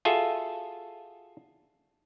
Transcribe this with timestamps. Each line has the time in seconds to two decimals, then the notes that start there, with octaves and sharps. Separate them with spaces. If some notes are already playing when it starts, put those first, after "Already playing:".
0.05 F4 F#4 G#4 A4 E5